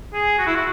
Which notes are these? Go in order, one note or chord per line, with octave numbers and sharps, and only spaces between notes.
G#4
F#4
E4
F#4